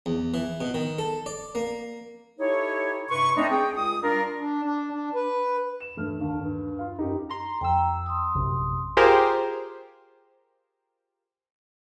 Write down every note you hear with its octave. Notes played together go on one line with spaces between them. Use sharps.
E2
E3
B2
D#3
A4
D5
A#3
D#4 E4 G4 A4 C#5
G2 C3 B4 C6 C#6
A3 C4 D4 D#4
G#4 G5
C#2 D#6
G3 D4 F4 A#4
D4
D4
D4
B4
E7
E1 G2 A3 F6
D#2 D4
G2
F4 F5
F#2 D#4 G4
A#5 C6
F2 G5 A#5 E6
C6 D#6
A#1 F#2 C3
F4 G4 G#4 A#4 C5